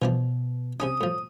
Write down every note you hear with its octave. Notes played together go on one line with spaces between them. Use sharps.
B2 E3 F3 D4
C3 C#4 D4 D#6
A2 F3